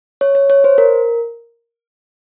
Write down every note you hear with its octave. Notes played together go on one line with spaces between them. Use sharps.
C#5
C#5
C#5
C5
A#4